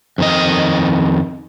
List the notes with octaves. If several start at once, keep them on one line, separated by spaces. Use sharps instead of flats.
F2 D#3 D#5